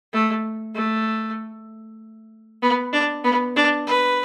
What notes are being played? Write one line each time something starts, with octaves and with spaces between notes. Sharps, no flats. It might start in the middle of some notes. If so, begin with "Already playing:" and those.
A3
A3
B3
D4
B3
D4
B4